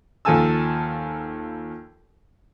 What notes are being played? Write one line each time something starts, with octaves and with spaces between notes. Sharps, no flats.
D#2 F3 A4 G#5 A5 E6